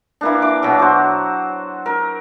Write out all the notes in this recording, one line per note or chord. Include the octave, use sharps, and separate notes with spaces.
E3 A#3 D4
D6
B2 F#3
F#4 C5
A#4